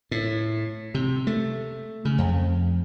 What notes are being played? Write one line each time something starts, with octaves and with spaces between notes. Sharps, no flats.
A2
C3
A3
C#3
F2